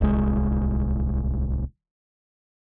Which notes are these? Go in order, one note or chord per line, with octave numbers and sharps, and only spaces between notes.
D1 C2 G#3